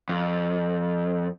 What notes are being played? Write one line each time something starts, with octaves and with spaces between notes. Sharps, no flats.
F2